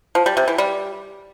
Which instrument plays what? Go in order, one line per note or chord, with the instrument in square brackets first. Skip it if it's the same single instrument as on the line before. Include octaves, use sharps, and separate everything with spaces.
[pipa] F3
G3
C3
E3
G3